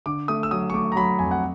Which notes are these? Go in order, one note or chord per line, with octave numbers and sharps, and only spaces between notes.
D3 D6
A3 D#6
E6
F#3 D#6
C#6
A3 D6
A#5
F#3 B5
F2 G#5
F#5